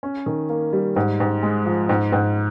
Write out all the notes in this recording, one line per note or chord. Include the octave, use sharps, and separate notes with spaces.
C#4
D#3
A#3
G3
G#2
G#2
G#3
F3
G#2
G#2